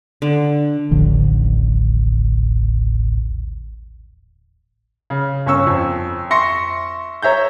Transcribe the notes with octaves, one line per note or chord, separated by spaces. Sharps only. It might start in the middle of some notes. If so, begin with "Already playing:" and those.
D3
D#1 A1 D3 F3
C#3
G1 C#4 C#6 E6
F2
E5 C6 C#6 A#6 C#7
C#5 E5 A#5 G6